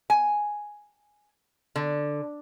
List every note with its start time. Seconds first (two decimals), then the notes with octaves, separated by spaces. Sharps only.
0.10 G#5
1.76 D3